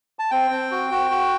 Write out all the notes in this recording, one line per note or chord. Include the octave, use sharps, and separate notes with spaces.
A5
C4 G5
C4
F#4
F#4
F#4